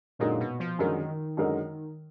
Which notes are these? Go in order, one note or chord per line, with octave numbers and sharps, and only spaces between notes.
F#2 A#2 D3 G#3 D#4 A#4
B2
F3
F#2 D3 D#3 G#3 D#4 A#4
F#2 D3 G#3 D#4 A#4